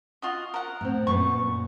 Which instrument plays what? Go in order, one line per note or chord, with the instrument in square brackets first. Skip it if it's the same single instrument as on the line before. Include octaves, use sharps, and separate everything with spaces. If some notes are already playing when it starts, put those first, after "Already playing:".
[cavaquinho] F4 F#4 D#5
A#4 F#5
[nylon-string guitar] A2 C4
[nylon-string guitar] F#2 A#2 B4 [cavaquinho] C#6